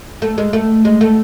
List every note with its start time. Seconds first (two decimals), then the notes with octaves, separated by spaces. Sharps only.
0.22 A3
0.38 G#3
0.53 A3
0.85 G#3
1.01 A3